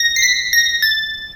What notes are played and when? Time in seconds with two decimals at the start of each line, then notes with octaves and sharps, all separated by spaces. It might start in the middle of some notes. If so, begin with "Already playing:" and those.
Already playing: A#6
0.16 C7
0.22 B6
0.53 A#6
0.82 A6